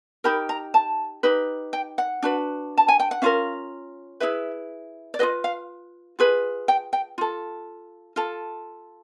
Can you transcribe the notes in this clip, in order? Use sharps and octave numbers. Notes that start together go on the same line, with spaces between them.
D#4 G4 A#4 B5
A#5
A5
D#4 G4 B4
G5
F#5
D4 F#4 B4
A5
G#5
G5
F#5
C#4 F4 A#4 F5
E4 G#4 B4 E5
D5
F4 G#4 B4 D#5
F5
F4 G#4 B4
G5
G5
F4 A4
F4 A4